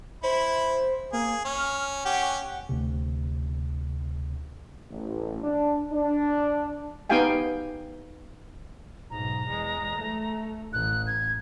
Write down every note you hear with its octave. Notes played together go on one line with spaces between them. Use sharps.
E4 C5 B5
A#3 G#4
C#4 F6
C#4 G4 F#5
D2 C3
A1
D4
D4
B3 D#4 G4 F5 G5 G#5
B1 G#2 A#5
E2 G#3
A3
A1 F#6
G#6